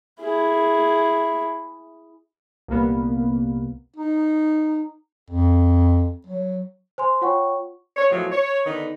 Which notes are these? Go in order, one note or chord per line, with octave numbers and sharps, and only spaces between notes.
E4 G#4
C2 A#2 A#3 B3
D#4
F2
F#3
C5 G#5 C6
F4 C#5 F#5 G5 C#6
C#5
E2 A2 D#3 F3 F#3
C#5
D3 D#3 B3 D#4